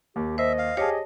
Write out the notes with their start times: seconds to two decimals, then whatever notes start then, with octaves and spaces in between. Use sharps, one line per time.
0.16 D#2 G4
0.38 C5 D#5 E5
0.58 F5
0.77 G4 G#4 C#5 D#5 A5